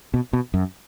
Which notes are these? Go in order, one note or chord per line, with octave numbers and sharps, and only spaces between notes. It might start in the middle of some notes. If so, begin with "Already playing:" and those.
B2
B2
F#2